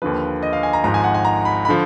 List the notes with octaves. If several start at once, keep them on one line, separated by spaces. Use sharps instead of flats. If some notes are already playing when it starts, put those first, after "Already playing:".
D#2 D3 F3 B4
D#5
F5
G#5
A#5
G#1 G#2 F3 A#5
G#5
F#5
G#5
A#5
B5
B5
D3 F3